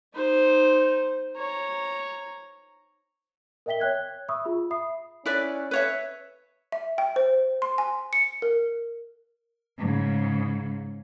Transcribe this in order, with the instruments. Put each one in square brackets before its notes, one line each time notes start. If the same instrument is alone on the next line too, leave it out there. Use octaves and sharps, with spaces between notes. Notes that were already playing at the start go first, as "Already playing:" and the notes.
[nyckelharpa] D#4 C5
C#5 A#5
[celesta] A#4 D#5 E5 G5 B6 G7
C#5 G5 F#6 G#6
E5 B5 C#6 D#6 E6
F4 G#4 B5
E5 B5 D#6 C7
[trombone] C#4 [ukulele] E4 B4 D5
[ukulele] B4 C#5 E5
[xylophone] E5
G5
C5
C6
G#5
C#7
A#4
[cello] G#2 C#3